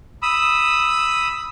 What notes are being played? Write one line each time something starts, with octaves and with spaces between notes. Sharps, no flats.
B5 D#6 E6